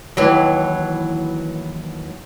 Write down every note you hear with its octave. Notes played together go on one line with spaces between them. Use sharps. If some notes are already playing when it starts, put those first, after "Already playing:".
D#2 E3 F#3